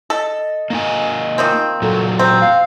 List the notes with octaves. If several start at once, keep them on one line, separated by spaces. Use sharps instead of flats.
A4 D#5
A#3 D#4 G#5
D#3 F3 C4
A#2 F#3 A4
C4 A#5
F5